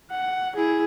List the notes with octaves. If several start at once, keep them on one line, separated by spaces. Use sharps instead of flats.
F#5
E4 G#4